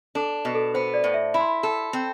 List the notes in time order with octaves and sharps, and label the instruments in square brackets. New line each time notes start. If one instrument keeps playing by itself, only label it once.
[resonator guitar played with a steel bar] D4 [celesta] A4
[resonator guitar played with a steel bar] B2
[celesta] A4
[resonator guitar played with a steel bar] B3 [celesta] C5
[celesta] D5
[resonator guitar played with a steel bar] A2
[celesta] E5
[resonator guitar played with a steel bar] E4 [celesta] B5
[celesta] C6
B5
[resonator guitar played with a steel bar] A4
C4